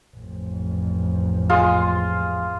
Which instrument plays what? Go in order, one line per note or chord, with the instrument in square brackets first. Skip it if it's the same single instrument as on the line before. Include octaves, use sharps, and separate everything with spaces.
[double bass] A1 F2
[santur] G#3 F4